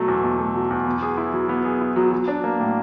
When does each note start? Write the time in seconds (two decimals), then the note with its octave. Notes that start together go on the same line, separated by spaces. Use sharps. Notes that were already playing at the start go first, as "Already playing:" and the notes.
Already playing: B2 F#3 A3
0.08 E2
0.24 B2
0.39 A3
0.55 F#3
0.71 E2
0.86 B3
1.02 G#4
1.18 E4
1.33 F#3
1.49 B3
1.65 G#4
1.81 E4
1.96 F#3
2.12 F#3
2.28 D4
2.44 A#3
2.60 A2